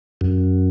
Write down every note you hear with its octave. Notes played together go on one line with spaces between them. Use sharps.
F#2